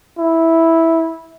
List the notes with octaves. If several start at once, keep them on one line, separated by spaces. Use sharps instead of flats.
E4